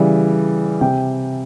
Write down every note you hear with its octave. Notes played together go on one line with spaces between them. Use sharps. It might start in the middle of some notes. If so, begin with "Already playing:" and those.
Already playing: C#3 E3 G3
C3 G5